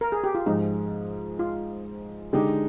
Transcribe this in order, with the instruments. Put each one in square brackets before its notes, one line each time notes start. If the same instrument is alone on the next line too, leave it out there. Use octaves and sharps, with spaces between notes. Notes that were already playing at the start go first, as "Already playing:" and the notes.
[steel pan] A#4
G#4
G4
F4
[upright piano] G#2 F3 G#3 [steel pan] D#4
[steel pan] F4
[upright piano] D3 G#3 D#4 [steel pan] G4